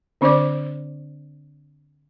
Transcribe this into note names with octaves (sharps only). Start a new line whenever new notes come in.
D3 C4 D4 C5 D5 D6